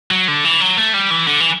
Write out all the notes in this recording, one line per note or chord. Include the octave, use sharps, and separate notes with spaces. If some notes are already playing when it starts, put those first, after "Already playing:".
F#3
D3
E3
F#3
A3
G3
E3
D3
E3